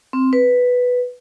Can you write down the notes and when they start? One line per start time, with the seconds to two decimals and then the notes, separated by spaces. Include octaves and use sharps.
0.13 C4
0.33 B4